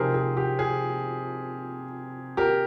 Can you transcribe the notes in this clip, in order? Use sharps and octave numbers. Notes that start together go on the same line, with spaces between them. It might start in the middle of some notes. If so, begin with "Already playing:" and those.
Already playing: C3 F3 C4 D#4 G4 G#4 A#4 C5
G#4
G4
G#4
G4 A#4